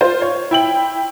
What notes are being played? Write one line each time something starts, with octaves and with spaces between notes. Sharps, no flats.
F4 C5
C#5
E4 G5 F#7